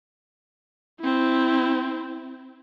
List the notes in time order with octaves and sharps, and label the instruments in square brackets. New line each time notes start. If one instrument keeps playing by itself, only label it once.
[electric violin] C4 E4